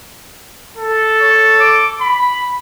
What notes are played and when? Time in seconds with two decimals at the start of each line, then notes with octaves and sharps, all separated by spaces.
0.77 A4
1.20 C#5
1.60 D6
2.01 B5